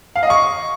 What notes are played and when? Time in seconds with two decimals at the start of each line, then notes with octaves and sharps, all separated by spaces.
0.16 F5
0.23 D#5
0.30 C#6